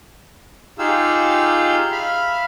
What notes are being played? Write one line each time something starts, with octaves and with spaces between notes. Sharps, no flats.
D#4 F4 G4 G#4 F5 E6
E5 F5 B5 F6